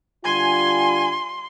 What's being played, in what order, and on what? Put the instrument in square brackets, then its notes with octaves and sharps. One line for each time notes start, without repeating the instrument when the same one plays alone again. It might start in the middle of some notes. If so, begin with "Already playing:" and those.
[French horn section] D3 G3 F4 [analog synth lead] G#5 [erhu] C6